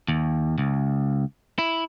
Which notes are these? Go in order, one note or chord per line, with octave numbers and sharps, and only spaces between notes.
D#2
C#2
E4